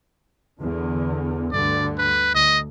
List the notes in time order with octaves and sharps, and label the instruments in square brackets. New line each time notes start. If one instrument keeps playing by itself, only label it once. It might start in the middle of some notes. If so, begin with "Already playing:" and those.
[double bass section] E2 D3
[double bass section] D2 G2 D3 [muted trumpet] D5
[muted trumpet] B4
[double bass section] D2 [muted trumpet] D#5